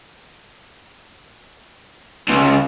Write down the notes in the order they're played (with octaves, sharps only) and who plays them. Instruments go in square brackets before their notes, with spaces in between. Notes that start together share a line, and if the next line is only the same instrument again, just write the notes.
[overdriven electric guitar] C#2